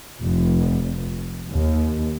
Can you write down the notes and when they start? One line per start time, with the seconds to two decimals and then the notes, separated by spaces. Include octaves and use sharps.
0.20 F1
1.49 D#2